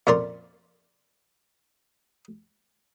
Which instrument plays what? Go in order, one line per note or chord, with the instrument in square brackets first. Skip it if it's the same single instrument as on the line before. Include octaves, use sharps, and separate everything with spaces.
[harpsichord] F2 A#2 C#4 A#4 D5 C6